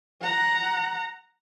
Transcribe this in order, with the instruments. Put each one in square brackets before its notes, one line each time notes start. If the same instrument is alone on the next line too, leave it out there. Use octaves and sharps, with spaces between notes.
[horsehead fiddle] F#5 A#5